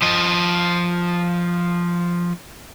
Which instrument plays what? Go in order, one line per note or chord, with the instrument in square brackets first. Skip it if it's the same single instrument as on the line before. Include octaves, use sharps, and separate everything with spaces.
[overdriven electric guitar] F3 D#5